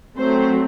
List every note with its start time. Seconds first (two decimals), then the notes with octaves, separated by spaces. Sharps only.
0.17 F#3 A3 C4 C5